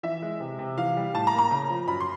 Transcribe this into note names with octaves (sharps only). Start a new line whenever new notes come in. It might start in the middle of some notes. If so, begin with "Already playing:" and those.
E3 E5
G#3
C3
C3
E3 F5
G3
A2 A5
A#5
A#3
A#5
C#3
F3
F#2 B5
C6